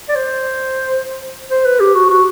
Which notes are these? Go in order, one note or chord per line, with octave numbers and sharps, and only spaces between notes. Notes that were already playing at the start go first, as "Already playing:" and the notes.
D5
C5
C5
B4
G4
F#4
F#4